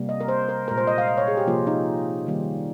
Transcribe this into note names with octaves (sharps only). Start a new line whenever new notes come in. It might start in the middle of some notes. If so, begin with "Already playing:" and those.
Already playing: C3 G3 A#3
D#5
A#4
C5
A#4
A#2 G#3 A#4
C5
D#5
F5
D#5
C#5
G#4
G4
C3 F3 A#3 F4
D#4
D#3 G3 A#3